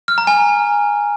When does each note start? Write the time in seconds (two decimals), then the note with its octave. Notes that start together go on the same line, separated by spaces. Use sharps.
0.08 F6
0.18 A#5
0.27 G#5